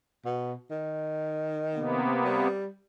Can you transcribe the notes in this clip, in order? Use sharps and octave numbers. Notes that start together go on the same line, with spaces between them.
B2
D#3
C3 A#3 B3
G3